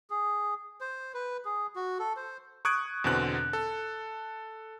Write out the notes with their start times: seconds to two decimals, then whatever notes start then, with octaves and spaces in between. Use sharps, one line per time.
0.10 G#4
0.81 C5
1.14 B4
1.45 G#4
1.76 F#4
1.99 A4
2.17 C5
2.65 C#6 D#6 F#6 G#6 D7
3.04 E2 B2 D3 C4 F#6
3.53 A4